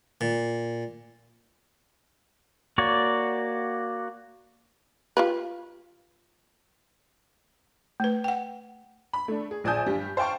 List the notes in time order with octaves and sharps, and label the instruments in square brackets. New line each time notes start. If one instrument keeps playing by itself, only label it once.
[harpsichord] A#2
[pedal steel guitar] A#3 F#4 C#5 D5
[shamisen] F4 G4 B4
[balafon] A3 B4
F#5 G5
[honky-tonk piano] B5
A3 D4
G#4
A#1 D5 G#5 A5 D#6 G6
G2 G3
C5 F5 G5 A5 C#6